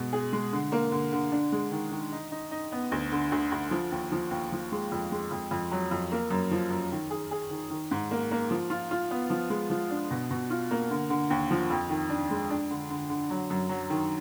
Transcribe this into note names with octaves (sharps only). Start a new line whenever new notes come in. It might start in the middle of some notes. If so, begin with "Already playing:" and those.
Already playing: B2 G#3
G#4
G#3
D3
A#3
D3
D3
D4
G#3
D#3
D#3
D#4
D#4
D#4
B3
D2
D3
D2
D2
F3
D#2
F3
D#2
F3
G#3
F2
G#3
F2
F2
F#3
F2
A#3
F#2
F3
F#2
D#3
G#4
G#4
D#3
D#3
G#2
A#3
A#3
F3
F4
F4
B3
F3
G#3
F3
D4
B2
B2
F4
A#3
D3
D3
D#2
F3
F2
D#3
D4
G#3
D4
D3
D3
D3
F#3
F#2
F#3
D#3